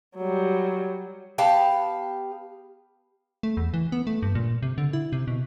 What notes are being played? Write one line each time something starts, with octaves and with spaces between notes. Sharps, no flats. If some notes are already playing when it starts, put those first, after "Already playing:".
F#3 G3
B3 G4 F5 A5
A3
E2
E3
B3
A3
G2
A#2
C3
D3
E4
C3
B2